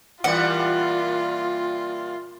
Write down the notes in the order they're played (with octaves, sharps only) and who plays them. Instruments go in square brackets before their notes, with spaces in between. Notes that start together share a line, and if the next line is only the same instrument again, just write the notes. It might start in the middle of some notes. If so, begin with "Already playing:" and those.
[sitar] A#2 E3 G3 [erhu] F4 [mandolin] F#5